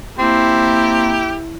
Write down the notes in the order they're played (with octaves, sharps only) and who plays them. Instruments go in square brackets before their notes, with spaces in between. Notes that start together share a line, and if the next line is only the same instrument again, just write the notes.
[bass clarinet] A#3 [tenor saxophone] C4 [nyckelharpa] E4 [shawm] G4